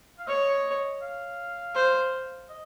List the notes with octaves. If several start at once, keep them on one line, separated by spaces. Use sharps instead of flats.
F5
C#5 D#5
F5
C5
D#5